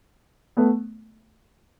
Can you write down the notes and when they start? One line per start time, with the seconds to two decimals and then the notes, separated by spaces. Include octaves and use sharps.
0.57 A3 B3